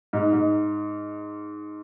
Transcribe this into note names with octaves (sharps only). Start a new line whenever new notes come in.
G#2
G#2